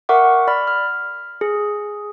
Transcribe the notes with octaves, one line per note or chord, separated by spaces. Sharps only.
A#4 E5 F#5 C#6 D6
D5 B5 F6
F6
G#4